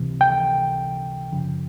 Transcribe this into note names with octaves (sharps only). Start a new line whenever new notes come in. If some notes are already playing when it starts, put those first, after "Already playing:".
Already playing: C#2 C3 E3
G5
F#2 C#3 F3